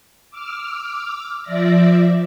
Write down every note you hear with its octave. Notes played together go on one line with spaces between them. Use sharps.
D6 E6 F6
F3 D5 E5 A#6